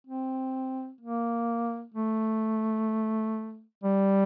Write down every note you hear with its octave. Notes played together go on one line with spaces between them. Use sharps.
C4
A#3
A3
G3